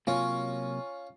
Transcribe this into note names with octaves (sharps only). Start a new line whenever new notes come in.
C3 F#3 A#3 C#4 F4